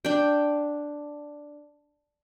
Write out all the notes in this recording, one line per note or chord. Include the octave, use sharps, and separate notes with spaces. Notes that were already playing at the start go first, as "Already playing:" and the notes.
D4 G5